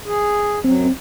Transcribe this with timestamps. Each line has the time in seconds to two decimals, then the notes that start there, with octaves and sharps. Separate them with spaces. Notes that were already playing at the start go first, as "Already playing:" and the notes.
0.06 G#4
0.64 F#2 F#3 C4